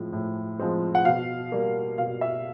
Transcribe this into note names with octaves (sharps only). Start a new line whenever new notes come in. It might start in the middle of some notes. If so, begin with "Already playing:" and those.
Already playing: A2 F3 G#3 C4
A2
F3 G#3 C4
F#5
B2 F5
G3 A#3
B2 F5
E5